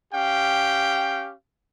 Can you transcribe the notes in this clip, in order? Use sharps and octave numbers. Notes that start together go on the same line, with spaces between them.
C#4 G4 F5 G5